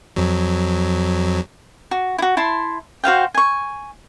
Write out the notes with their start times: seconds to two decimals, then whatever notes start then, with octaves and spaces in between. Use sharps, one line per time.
0.16 F2 F#3
1.91 F#4
2.18 E4 F#4
2.37 E4 A5 C6
3.04 F#4 C5 F5 G5
3.34 G#5 C#6